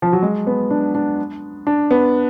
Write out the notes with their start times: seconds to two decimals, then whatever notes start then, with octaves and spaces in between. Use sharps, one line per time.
0.02 F3
0.13 F#3
0.22 G#3
0.47 B3
0.70 D4
0.95 D4
1.67 D4
1.91 B3